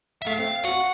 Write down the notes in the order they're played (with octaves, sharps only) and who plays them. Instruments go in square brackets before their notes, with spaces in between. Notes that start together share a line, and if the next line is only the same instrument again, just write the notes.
[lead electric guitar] E5
[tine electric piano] A3 [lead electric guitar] F5
[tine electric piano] C4
[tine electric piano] F#4 [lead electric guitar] F#5